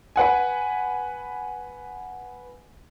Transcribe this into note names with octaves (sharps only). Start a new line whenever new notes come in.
B4 F#5 G#5